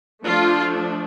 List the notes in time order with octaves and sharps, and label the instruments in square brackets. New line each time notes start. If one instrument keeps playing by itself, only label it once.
[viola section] F3 A3 D4 F4